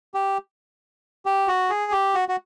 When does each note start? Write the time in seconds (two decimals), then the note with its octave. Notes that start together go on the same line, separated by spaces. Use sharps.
0.14 G4
1.26 G4
1.47 F#4
1.70 G#4
1.92 G4
2.14 F#4
2.28 F#4